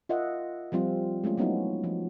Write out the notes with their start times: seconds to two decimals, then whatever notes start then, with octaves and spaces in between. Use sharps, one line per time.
0.09 F4 A#4 D#5 E5 F#5
0.72 F3 G3 C4 F4
1.24 G#3 A3 C#4 F4
1.37 F#3 B3 C#4 D#4 E4 F#4
1.84 F3